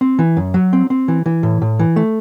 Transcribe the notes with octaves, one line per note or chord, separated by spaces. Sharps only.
C4
E3
F#2
F#3
C4
C4
E3
E3
A2
A2
E3
A3